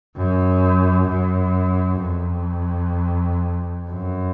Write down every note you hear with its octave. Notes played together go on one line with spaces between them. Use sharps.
F#2
F#2
F2
F#2